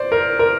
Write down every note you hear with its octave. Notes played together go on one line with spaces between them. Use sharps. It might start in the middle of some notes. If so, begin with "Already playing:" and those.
Already playing: C5 D5
A#4
A#4